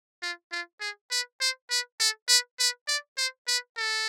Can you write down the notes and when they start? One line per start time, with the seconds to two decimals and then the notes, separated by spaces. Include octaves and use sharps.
0.23 F4
0.52 F4
0.81 G#4
1.11 B4
1.41 C5
1.70 B4
2.00 A4
2.29 B4
2.59 B4
2.88 D5
3.18 C5
3.48 B4
3.77 A4